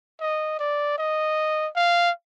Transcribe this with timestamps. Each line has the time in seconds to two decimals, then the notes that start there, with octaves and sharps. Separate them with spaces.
0.21 D#5
0.59 D5
0.98 D#5
1.76 F5